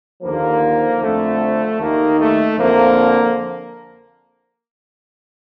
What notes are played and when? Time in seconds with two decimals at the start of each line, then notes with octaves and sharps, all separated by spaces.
0.23 D#2 D3 F3 A#3
1.01 F2 D3 F3 A3
1.79 D#2 D#3 A#3
2.18 A3
2.58 F2 D3 F3 A#3